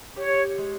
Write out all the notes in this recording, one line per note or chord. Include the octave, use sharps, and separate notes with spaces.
G4 C#5
G#3